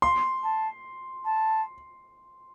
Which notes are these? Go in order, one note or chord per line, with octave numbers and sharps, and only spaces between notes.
F5 C6
A5
A5